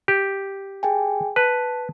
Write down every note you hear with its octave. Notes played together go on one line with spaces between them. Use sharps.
G4
G#4 G5 G#5
B4 A5